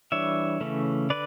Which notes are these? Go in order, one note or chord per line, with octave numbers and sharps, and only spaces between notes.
E3 G3 D4 C#5 E5
C#3 E3 A3 C#4
D3 B4 D5